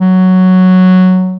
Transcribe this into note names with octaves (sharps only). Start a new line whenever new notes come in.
F#3